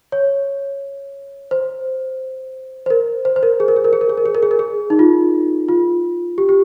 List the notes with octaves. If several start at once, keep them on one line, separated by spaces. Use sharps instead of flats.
C#5
C5
C5
A#4
C5
C5
A#4
G#4
A#4
G#4
A#4
G#4
A#4
G#4
A#4
G#4
A#4
G#4
A#4
G#4
D#4
F4
F4
G4
G4